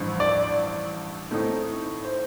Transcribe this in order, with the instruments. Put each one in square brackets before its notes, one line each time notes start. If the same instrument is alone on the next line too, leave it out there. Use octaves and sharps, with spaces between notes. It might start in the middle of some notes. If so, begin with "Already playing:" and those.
Already playing: [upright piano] A1 G2 F3
[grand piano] D5
[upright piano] A2 A3 C4 D#4
[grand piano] C5